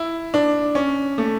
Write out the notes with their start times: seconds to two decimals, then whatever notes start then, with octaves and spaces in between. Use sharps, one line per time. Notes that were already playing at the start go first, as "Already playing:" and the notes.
Already playing: E4
0.34 D4
0.75 C#4
1.18 A3